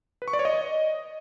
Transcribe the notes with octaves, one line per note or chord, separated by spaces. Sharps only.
B4
C#6
D5
C#5
D#5